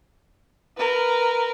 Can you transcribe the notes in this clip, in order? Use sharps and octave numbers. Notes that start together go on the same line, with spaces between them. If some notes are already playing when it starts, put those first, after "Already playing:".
A#4 B4